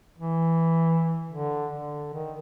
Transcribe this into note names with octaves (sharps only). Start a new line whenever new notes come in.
E3
D3
D3
D#3